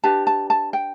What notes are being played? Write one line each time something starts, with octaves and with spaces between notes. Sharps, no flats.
D4 G4 B4 A5
A5
A5
G5